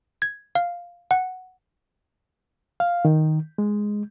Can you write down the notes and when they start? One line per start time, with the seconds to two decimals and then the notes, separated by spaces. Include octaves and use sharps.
0.22 G#6
0.55 F5
1.11 F#5
2.80 F5
3.05 D#3
3.58 G#3